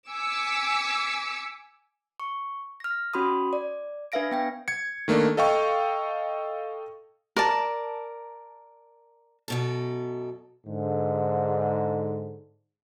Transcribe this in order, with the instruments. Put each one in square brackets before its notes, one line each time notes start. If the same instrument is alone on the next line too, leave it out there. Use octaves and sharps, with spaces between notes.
[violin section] G#5 D6 E6 B6 C#7
[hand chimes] C#6
F6 A#6
C#4 F#4 B5 C6 D#6
D5
D4 B4 E5 F5 A#6 D7
B3 G5 A#6
[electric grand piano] G#6 C#7
D#3 A3 A#3 D4
A4 D#5 F5 G5 C#6
[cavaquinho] A#4 D5 A5
[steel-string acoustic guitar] F#2 B2 A4
[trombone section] G#2 D3